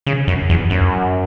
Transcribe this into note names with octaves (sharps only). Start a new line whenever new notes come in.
C#3
F#2
E2
F#2